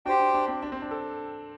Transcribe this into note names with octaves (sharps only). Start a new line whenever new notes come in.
D4 F#4 G4 C5 G5
D4
D4
C4
D4
C4
D4
A4